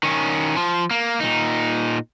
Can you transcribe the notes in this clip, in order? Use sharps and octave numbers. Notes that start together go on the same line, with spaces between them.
D#3 C#4
F3
A#3
A#2 D#4